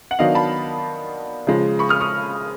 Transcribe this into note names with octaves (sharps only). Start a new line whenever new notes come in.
F#5
D#3 F#3 B3 D4 D#5 F5
A5 B5
C#3 F3 G#3
B5 C#6
D#6 F6
C#6 D#6